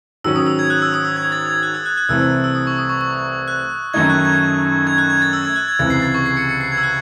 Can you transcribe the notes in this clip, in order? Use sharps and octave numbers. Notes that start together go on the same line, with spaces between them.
G#2 D#3 F#3 C#4 E6
D#6
E6
G#6
F#6
E6
D#6
E6
G#6
A6
G#6
F#6
E6
F#6
F#6
C2 C3 E3 A3 C4 E6
E6
E6
D#6
C#6
D#6
C#6
C#6
F#6
F#2 D#3 A3 D#4 G#6
F#6
G#6
G#6
F#6
G#6
A6
E6
G#6
F#6
G#6
C#2 C3 E3 G#3 A6
C7
A6
C#6
C7
C#7
C#7
C7
G#6
E6
F#6